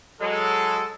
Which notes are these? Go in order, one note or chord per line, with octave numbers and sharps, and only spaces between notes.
F#3 G#3 A4